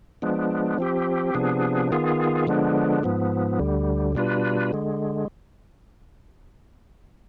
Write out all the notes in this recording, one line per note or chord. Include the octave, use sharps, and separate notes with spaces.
F3 G#3 B3 D4
F3 C4 G4
C3 F3 B3 D4 G#4
D#3 B3 F4 G#4
D3 F3 G#3 B3 D4
G#2 F3 B3
D2 D3 G3
B2 G3 D4 F4 B4
D3 G#3